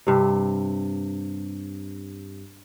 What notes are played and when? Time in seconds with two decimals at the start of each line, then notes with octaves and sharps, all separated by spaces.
0.07 G2 C3